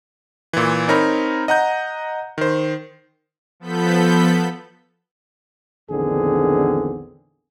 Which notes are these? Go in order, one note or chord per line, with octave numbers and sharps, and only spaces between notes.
A#2 E3
C4 D#4 A#4 C#5 A#5 B5
D#5 F#5 A#5 G6
D#3 C5
F3 B3 A4 B5 G6 B6
A#1 E2 D3 D#3 C4 G#4